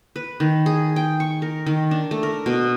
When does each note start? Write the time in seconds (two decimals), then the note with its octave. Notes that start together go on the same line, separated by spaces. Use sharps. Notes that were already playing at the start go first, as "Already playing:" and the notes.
0.16 B4
0.40 D#3
0.66 G#4
0.96 G5
1.20 C#6
1.42 A#4
1.66 D#3
1.91 D4
2.11 A3
2.23 A#4
2.46 B2